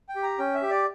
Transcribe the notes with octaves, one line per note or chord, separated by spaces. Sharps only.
G5
G4
A#5
C#4 G5
E5
G4
D5